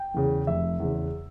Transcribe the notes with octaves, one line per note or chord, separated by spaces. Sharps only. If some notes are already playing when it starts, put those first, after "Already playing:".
Already playing: G5
E2 C#3
F1 E5
E2 C#3